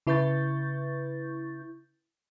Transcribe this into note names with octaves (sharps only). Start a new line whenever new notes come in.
C#3 E4 B4 C#6 G6 A6